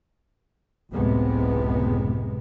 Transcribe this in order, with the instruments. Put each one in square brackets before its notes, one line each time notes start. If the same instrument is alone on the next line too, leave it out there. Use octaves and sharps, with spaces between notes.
[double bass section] F#1 C#2 A2 C3 G#3 B3